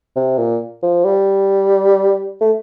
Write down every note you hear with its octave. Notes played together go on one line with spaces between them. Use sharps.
C3
A#2
F3
G3
A3